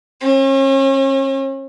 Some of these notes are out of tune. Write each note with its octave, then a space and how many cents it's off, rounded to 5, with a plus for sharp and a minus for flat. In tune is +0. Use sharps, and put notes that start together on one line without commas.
C#4 -40